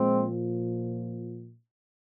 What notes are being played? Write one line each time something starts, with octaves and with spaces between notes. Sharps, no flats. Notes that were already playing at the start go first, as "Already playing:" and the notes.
Already playing: A#2 F3 G#3 C4